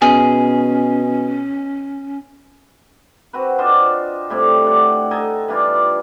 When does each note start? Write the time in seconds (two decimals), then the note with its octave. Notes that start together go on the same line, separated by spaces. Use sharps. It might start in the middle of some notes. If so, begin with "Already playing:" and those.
0.02 B2 C#4 G#4
3.33 C4 F#4 B4
3.58 D4 F4 C5 D#5
4.30 A2 G3 C4
4.64 D4 F#5
5.11 D#4 A4 D#5 G#5
5.48 E3 G3 D4 F4